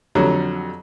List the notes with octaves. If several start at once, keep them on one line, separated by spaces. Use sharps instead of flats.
F2 D3 F#3 G3